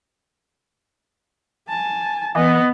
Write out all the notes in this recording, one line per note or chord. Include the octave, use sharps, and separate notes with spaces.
G#5 A5
E3 B3 D#5